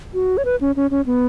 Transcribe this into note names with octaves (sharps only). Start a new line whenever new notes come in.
F#4
C#5
B4
C#4
C#4
C#4
B3